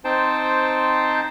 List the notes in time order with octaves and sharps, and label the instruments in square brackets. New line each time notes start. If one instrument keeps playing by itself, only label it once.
[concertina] C4 D#4 C5 G5 A5